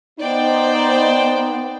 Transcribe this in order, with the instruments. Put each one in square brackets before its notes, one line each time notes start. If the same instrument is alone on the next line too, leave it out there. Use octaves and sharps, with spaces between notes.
[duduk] B3 [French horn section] D#4 [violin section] C5 D5 G5